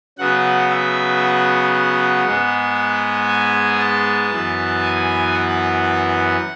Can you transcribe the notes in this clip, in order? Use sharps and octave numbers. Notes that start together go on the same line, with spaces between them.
C#3 F#3 B3 F#5
E5
F#5
F#5
G#2 G#3 B3
G#5
A5
F#2 E3 B3
G#5
F#5